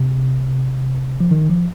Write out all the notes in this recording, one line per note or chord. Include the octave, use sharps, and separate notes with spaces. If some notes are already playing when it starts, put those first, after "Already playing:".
Already playing: C3
F3
D#3
F3